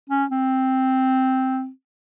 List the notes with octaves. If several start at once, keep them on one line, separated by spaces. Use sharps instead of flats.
C#4
C4